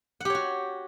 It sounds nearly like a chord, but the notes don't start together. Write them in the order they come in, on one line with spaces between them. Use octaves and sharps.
F#5 G4 C#5 F#4